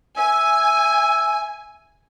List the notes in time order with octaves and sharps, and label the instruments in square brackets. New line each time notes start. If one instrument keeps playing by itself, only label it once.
[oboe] E5 [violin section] G#5